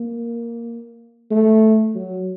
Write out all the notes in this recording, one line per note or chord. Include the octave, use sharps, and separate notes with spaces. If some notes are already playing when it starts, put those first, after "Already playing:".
Already playing: A#3
A3
F#3